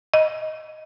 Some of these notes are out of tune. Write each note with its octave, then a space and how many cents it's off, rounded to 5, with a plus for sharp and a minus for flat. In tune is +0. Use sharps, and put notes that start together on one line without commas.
D#5 +10